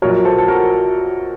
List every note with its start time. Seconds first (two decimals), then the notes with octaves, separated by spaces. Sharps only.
0.02 A#1 A#2 F#3 A#4 C#5
0.25 A4 C5
0.38 A4
0.48 F#4 A#4